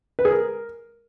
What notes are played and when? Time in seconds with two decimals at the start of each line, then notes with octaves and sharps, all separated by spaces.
0.19 B4
0.25 G#4
0.31 A#4